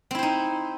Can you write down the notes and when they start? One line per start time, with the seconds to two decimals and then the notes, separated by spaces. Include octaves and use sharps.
0.11 C4
0.15 E4
0.19 C5
0.23 D#4